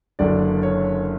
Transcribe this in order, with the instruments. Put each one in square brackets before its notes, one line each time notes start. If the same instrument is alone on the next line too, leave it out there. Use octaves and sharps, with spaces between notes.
[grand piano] F#1 F#2 D3 D5
C#5